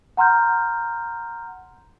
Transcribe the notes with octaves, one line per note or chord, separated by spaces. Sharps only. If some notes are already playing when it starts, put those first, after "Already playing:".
F#5 A#5 C6 F6 G6